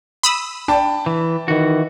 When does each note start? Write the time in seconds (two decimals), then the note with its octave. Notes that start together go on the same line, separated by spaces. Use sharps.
0.23 B5 D#6 E6
0.68 D4 G5 A5 B5
1.06 E3
1.48 D#3 E3 F#4